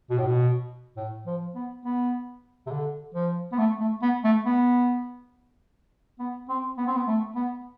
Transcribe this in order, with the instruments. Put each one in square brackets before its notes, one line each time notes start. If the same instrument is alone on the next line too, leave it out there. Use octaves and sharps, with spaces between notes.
[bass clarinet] B2
A2
B2
A2
F3
B3
B3
C3
D3
F3
B3
A3
A3
B3
A3
B3
B3
C4
B3
C4
B3
A3
B3